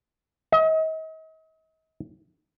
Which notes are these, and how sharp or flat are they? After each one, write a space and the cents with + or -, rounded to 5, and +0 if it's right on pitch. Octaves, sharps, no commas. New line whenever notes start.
D#5 +40